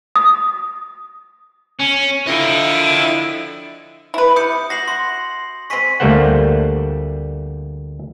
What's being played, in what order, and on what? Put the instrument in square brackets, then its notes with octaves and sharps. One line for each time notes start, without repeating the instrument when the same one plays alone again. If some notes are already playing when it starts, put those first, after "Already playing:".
[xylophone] D#6
[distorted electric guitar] C#4
[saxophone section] D3 F3 E4 [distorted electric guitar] D#5 G5
[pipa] E4 B4
[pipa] C3 [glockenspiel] D#6 G6 C#7
[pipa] F#4 [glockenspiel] A#6 C7 F#7
[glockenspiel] C6
[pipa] G#3 C4 [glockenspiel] C#6 B6 D#7
[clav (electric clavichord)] D2 G3 A3 A#3 C5 F#5